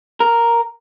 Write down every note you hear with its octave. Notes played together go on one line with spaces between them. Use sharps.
A#4